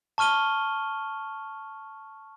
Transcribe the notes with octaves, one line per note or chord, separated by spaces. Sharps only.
A5 C#6 F6 D#7 G7